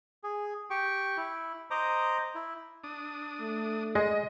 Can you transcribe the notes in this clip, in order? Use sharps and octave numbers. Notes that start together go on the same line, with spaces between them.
G#4
G4 G5 C#6
E4
C5 D#5 A#5 D6
E4
D4 D#6
A3
G#3 D#5